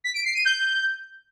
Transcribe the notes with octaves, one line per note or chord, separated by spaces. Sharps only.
B6
D7
C7
D#7
G6